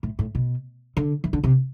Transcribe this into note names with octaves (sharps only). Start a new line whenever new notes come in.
A2
A2
B2
D3
E3
D3
C3